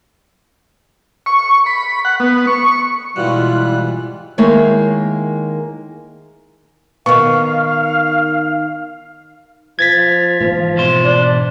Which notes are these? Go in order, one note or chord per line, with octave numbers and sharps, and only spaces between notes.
C#6
B5
F#5
B3
C#6
G#2 B2 E3 G3 E4 F4 F#6
D#3 G#3 A#3 E4 C#5
D#3 B3 F5 C#6
F3 G#6 A6 B6
G#2 E3 F3 A#3
B2 C5
D4